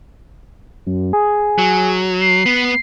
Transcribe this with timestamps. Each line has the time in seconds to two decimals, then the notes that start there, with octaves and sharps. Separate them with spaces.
0.86 F#2
1.13 G#4
1.58 F#3
2.21 C7
2.46 B3